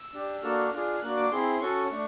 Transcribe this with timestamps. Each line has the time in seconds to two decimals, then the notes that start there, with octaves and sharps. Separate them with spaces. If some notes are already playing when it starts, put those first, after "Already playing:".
Already playing: E6
0.13 D4 G4
0.42 A#3 D4 F#4 A4 F6
0.72 D4 F4 G#4 F6
1.02 A#3 D4 F#4 F#6
1.17 D6
1.32 C4 E4 G#4 C6
1.61 C#4 F#4 A4 C#6
1.91 A3 D4